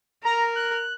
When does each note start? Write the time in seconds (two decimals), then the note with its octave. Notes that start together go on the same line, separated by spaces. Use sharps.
0.25 A#4 A#5
0.56 F#6